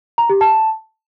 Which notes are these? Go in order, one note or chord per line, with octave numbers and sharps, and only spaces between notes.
A#5
G4
A5